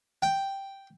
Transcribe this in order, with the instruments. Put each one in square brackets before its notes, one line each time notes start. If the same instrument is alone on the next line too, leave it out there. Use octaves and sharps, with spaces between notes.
[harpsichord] G5